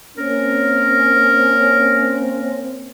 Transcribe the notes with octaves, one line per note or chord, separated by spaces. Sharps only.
A#3 C4 C#4 A#4